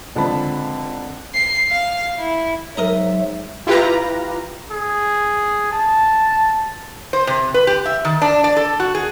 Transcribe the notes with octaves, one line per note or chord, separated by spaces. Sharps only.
C#2 D3 F3 C4 A5 B5
C7
F5
E4
G#2 F#3 A#4 D#5 E5 A#5
E4 F4 G4 B4 A#5
G#4
A5
C5
C3
B4
G4
E5
D#3
D4
D5
A4
F#4
G#4